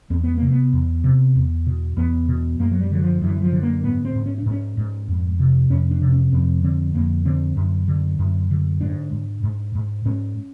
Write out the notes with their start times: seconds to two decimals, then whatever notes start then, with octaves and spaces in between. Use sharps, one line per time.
0.10 E2 C4
0.24 B3
0.38 C3 A#3
0.51 B3
0.73 E2
1.04 C3
1.35 E2
1.67 B2
1.97 E2 B3
2.28 B2
2.59 F#2 A#3
2.71 F#3
2.80 G3
2.91 D3 F#3
3.02 F3
3.21 F#2 E3
3.42 F3
3.52 D3
3.63 A#3
3.84 G#2 B3
4.05 C4
4.15 G#2
4.26 C#4
4.38 D4
4.46 G#2
4.51 C#4
4.77 G#2
5.08 F2
5.39 C3
5.70 F2 C#4
5.91 D4
6.02 C3
6.12 C#4
6.33 F2 C4
6.64 D3 C4
6.94 F2 A#3
7.25 D3 C4
7.57 F#2
7.88 D3
8.19 F#2
8.51 D3
8.81 G#2 D4
9.12 G#2
9.43 G#2
9.75 G#2
10.05 G#2 C#4